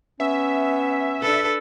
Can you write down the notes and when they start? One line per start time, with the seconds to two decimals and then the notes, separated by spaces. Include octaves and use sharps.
0.20 B3 C#4 E5
1.21 D4 A4 B4